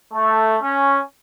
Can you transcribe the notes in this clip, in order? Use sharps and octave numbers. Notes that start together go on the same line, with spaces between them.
A3
C#4